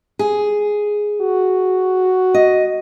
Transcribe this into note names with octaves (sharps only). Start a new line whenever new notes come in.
G#4
F#4
D#5